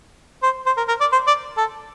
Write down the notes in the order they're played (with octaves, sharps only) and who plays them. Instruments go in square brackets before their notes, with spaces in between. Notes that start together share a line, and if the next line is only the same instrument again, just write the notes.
[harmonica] C5
C5
A#4
A#4
D5
C5
D5
A4